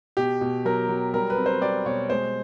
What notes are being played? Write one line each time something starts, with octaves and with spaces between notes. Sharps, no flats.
B2 G4
B2
F#3 A#4
F#3
G3 A#4
B4
C4
C5
G3 D5
B2 C#5
G#3 C5